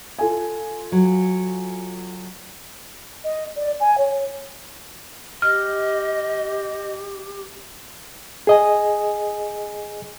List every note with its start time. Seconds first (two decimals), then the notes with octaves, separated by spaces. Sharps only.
0.19 F4 A4 G#5
0.92 F#3
3.24 D#5
3.56 D5
3.80 G#5
3.98 C#5
5.42 G4 D#5 F6
8.47 G#4 D#5 G#5